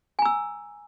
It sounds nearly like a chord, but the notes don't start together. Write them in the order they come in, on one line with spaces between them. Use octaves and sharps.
G#5 A#5 E6